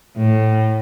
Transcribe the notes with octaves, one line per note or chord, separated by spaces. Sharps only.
A2